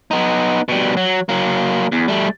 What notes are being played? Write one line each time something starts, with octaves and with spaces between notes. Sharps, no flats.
B3 D#4
B2 G3
F#3
F#3 A#3
E2
G3 A3